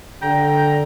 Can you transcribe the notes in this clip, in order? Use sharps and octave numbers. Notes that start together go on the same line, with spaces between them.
D3 G5 A#5